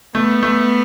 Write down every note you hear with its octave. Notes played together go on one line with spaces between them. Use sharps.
A3 B3
A3